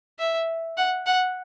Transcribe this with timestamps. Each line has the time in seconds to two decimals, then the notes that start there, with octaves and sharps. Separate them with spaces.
0.19 E5
0.77 F#5
1.06 F#5